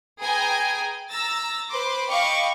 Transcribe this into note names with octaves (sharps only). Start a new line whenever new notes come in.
G#4 B4 G5 G#5 A#5
A#5 E6 A6 A#6
B4 C5 C6 D6
D#5 F5 G5 B5 C#6 D6